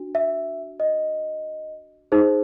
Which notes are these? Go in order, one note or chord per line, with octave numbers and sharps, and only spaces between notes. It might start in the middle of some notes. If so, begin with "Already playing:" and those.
Already playing: D4 F#4
E5
D#5
D#4 G#4 C5